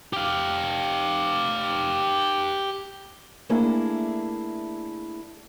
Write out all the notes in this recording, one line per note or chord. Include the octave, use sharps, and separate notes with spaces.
G4 F5
A3 A#3 D4 E4 G#4